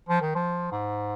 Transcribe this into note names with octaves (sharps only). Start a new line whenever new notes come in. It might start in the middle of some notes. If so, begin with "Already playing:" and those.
F3
D#3
F3
G#2